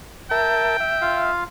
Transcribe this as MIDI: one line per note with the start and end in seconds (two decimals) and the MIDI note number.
0.31 0.77 70
0.31 0.77 76
0.31 1.35 79
0.31 0.77 81
0.80 1.32 76
1.01 1.44 65
1.01 1.44 77